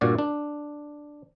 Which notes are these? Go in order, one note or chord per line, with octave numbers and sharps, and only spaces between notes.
G2 A#2 F#4 D5
D4